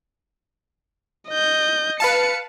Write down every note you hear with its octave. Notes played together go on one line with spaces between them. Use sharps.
D#5 G6
B4 F5 A5 C#7